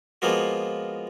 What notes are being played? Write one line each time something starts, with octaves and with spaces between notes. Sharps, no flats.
F3 G#3 A#3 B3 F4 F#4